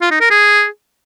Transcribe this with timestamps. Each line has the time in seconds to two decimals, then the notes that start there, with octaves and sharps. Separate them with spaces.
0.01 F4
0.11 D#4
0.21 A#4
0.30 G#4